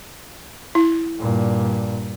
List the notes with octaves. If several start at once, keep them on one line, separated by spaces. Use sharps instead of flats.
E4
G2 A#2